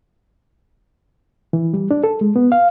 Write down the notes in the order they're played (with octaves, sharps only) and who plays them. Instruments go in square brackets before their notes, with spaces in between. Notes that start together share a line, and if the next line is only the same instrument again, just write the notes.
[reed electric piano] E3
G3
D4
A4
G#3
B3
F5